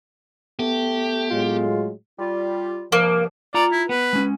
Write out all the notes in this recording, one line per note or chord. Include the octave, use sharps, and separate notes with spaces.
A3 B3 G4
A2 F#3 G#3 F4
G3 F4
G2 C3 F3 A#3
F4 D5 A#5
E4
B3 B4
G#3 C#4